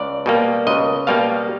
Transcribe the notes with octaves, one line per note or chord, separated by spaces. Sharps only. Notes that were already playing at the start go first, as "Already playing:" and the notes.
Already playing: C#2 D5
B2 G3 A#3
C#2 D#5
B2 G3 A#3 F5